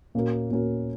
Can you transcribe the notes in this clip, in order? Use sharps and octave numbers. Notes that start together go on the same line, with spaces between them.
A#2 A#3 C#4 F#4 A#4
A#2 A#3 C#4 F#4 A#4